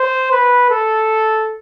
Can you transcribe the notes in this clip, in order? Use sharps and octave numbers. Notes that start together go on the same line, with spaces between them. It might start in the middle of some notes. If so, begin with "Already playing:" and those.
Already playing: C5
B4
A4